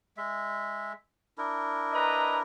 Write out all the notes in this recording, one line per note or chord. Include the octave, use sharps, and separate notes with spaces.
G#3 E5
D4 E4 A#4
B4 D#5 A#5